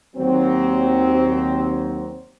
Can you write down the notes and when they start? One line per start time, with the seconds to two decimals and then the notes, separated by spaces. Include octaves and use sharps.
0.16 D#2 F#3 C4